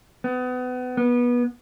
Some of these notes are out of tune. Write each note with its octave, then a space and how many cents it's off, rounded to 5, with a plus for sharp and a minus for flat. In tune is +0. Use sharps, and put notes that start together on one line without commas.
B3 +30
B3 -25